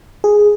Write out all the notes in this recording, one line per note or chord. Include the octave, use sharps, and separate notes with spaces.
G#4